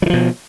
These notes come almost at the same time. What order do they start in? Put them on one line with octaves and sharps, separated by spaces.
F#3 D#3 F3 B2